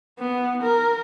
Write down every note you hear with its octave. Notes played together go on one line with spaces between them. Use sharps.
B3
A#4